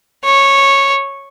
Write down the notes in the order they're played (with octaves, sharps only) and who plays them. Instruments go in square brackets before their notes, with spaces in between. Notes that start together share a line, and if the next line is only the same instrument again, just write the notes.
[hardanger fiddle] C#5